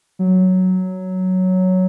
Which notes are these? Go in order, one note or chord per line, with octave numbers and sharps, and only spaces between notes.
F#3